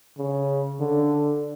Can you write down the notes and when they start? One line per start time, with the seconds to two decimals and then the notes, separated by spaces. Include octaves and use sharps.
0.18 C#3
0.80 D3